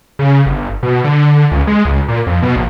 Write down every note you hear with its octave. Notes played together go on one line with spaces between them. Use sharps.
C#3
G1
B2
D3
D3
C#2
G#3
C#2
A#2
F2
B2
A#1